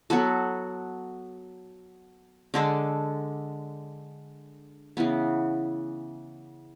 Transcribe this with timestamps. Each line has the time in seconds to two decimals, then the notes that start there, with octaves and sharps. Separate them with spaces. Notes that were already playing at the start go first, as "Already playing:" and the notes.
0.10 F#3 B3 F#4 A4
2.54 D3 G#3 D4 A4
4.97 C#3 E3 B3